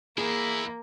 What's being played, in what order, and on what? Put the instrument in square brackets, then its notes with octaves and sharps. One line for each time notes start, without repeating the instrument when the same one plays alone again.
[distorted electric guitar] E2 E4 [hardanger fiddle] A#3 [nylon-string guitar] G#4